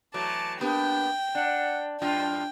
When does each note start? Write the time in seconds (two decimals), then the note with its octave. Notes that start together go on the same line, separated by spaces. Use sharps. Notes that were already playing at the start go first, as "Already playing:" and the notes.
0.14 E3 F#3 A3 A5 D6
0.61 A#3 B3 D4 G4 G5
1.35 D4 F#5
2.02 F#2 A2 D4 F4 G5